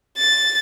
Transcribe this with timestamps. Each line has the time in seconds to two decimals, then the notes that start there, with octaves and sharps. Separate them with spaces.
0.18 A6